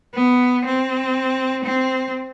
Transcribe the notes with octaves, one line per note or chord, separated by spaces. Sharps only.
B3
C4
C4